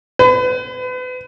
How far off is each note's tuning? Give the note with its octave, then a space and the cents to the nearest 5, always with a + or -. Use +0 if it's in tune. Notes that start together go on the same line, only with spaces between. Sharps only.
B4 +35